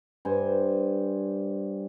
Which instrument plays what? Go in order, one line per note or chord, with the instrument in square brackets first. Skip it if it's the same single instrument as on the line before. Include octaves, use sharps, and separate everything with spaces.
[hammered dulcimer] G2 C5 G#5